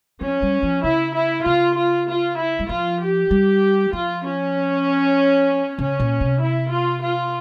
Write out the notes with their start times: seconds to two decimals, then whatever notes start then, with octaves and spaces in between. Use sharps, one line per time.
0.21 F3 C#4
0.42 G3
0.63 F3
0.83 C#3 E4
1.14 E4
1.45 C#3 F4
1.76 F4
2.07 F4
2.39 E4
2.59 G3
2.69 F3 F4
3.00 G4
3.31 G3
3.93 F3 F4
4.24 C#4
5.79 C#3 C#4
6.00 A#2
6.21 C3
6.41 E4
6.71 F4
7.02 F4